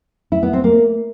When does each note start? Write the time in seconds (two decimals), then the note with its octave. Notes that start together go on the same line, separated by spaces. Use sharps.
0.32 E4
0.43 B3
0.53 C4
0.64 A#3